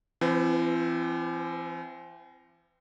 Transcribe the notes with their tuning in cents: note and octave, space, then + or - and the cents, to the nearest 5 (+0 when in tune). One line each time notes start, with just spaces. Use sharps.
E3 +45 C4 +0 B4 +25